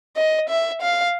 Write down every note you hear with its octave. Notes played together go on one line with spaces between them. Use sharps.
D#5
E5
F5